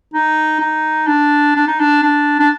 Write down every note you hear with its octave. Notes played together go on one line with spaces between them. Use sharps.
D#4
D#4
D4
D4
D#4
D4
D4
D4